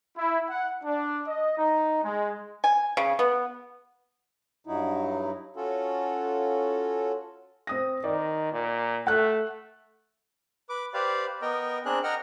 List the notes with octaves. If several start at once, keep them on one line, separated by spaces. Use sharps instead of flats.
E4
F#5
D4
D#5
D#4
G#3
G#5
C#3
B3
G2 F#3 D#4 E4
C#4 F4 F#4 A4
C4 D#6 A#6
D#3 D5
A#2
A3 F#5 F#6
B4 D6
G4 B4 C5 D5 F5
B3 A#4 D#5 G5
C4 D4 G#4 A#4 F#6
A#4 D#5 F#5 G5 A#5 F6